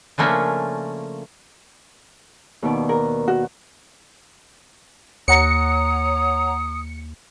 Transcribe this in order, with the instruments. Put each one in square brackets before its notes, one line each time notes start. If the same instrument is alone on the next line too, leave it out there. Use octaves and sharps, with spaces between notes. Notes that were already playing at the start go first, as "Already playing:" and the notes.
[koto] C#3 F3 A3 A#3 C#4 D4
[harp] D#2 B2 D5
[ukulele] A#4
F#4
[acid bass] D#2 [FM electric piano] C#5 F#5 A#5 [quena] D#6 [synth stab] C#7